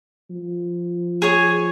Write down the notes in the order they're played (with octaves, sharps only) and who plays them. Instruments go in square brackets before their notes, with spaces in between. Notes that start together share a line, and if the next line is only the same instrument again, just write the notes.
[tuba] F3
[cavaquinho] G#4 C#5 G#5